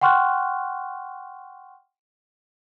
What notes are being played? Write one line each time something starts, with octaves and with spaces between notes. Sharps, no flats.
F#5 G5 C6 C#6 F6 F#6